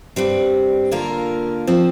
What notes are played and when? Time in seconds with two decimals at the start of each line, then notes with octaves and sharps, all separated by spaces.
0.16 G2 G3 C4
0.92 D3 A#3 F4 A#4
1.67 F3 C4